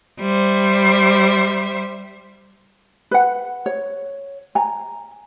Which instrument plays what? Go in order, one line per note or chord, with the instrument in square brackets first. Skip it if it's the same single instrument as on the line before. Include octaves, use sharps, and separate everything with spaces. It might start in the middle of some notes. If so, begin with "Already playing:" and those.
[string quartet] G3 C5 E5
[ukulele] B4 F#5
C#5
G#5 A#5